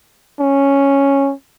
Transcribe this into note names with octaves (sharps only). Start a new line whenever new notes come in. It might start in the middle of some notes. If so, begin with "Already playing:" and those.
C#4